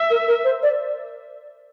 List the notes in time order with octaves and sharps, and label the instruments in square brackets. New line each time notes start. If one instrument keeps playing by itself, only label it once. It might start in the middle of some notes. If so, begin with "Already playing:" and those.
Already playing: [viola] E5
[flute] A#4
A#4
C5
D5